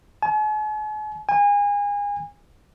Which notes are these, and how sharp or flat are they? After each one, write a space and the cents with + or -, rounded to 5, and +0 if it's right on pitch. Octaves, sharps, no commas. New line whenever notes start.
G#5 +45
G#5 -30